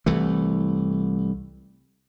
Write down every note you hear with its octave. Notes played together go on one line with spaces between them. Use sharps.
C2 E3 A3